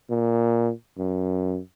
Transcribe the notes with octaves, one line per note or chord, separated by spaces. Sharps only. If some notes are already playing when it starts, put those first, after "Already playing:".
A#2
F#2